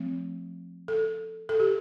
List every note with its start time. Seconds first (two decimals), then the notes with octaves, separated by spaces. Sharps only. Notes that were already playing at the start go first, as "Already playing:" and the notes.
Already playing: F3 A3 C4
0.88 A4
1.49 A4
1.60 G4